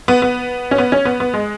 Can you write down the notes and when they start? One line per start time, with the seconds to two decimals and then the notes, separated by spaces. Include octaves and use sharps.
0.08 B3
0.22 B3
0.71 C#4
0.78 B3
0.92 C#4
1.05 B3
1.20 B3
1.34 G#3